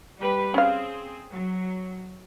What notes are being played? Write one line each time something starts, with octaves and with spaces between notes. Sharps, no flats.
G3 G4 B4
C4 C#4 G#4 F5
F#3